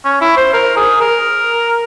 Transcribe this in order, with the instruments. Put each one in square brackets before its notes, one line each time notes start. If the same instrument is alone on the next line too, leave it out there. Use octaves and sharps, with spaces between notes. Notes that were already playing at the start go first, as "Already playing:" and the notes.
[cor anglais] C#4
E4
C5
A#4
G#4
A#4